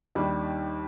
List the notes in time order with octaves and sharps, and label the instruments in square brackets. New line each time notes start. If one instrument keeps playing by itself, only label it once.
[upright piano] D#2 D#3 G3 D4